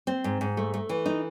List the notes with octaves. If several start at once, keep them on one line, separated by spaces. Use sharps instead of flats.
C4
G#2
G#2
A3
A3
E3
D#4